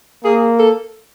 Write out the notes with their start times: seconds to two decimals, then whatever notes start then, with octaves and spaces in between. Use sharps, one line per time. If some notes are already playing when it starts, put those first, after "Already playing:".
0.24 A#3 G#4
0.59 A4